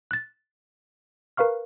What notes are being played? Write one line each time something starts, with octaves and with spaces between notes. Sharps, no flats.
F#6 A6
A#4 B4 F5 C#6 F6